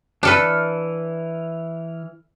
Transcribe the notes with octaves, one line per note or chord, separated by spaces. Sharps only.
E3 D4 A4 B4 F6